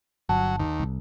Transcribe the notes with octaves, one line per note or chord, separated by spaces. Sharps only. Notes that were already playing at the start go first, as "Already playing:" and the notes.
G1 F#3 A5
D#2
C2